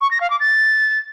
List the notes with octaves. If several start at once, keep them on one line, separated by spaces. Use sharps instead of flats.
C#6
A#6
F5
D6
A6